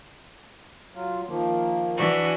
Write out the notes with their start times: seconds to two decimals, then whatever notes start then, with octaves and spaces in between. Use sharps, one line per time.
0.95 F#3 F4
1.28 D#3 F3 A#3
1.95 E3 D4 F#4